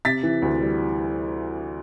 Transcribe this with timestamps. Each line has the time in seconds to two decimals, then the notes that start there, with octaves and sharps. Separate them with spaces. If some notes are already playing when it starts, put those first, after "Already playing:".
0.05 C3 A6 B6
0.23 E3
0.42 D2
0.61 G3